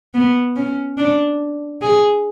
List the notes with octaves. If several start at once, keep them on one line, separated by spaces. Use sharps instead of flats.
B3
C#4
D4
G#4